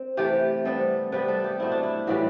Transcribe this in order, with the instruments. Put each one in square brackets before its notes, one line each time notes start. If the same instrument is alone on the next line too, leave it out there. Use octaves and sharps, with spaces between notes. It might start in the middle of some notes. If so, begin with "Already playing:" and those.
Already playing: [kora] C4
C3 E3 A3 G4
C3 G3 B3 A4
C3 G3 B3 B4
A4
G4
B2 A3 C4 E4
D4
E4
A2 E3 G3 F#4